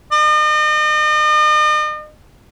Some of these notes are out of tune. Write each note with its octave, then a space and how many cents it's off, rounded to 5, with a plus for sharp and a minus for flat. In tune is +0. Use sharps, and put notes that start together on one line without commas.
D#5 -40